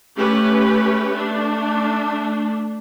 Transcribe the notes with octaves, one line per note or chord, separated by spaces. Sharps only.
A3 C#4 G4 B4
A3 D4